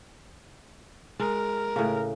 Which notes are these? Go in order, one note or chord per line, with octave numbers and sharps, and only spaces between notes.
G#3 A#4
A2 C#3